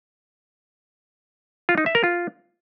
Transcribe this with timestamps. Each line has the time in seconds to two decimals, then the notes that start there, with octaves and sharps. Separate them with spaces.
1.69 F4
1.78 D#4
1.86 E5
1.95 A#4
2.04 F4